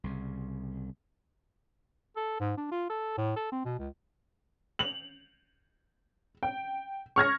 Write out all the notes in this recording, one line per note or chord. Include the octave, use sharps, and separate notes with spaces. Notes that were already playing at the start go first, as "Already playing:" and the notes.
C2 C#3
A4
G#2
D4
F4
A4
A2
A4
C4
B2
C#2
F7 F#7
G5
C#6 F6 G#6 A#6